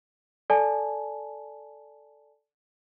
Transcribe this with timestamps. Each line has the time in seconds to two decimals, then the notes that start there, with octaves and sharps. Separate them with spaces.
0.50 A4 D5 G#5 A5